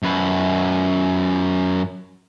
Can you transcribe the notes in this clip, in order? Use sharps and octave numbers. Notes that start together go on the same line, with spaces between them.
F#2 B4